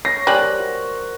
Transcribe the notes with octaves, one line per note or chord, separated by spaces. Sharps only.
C#5 A#6 C7
G3 A#4 C5 C#5 G#5 F#6 F#7
F#4